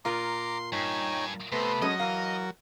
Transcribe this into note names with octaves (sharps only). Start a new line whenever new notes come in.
A#2 F4 A#4 A#5 C6 D6
G2 D#4 C#5 G5 G#5
C3 A3 B3 B4 C5
F#3 G#3 C#4 A4 D#5
E3 A#4 F5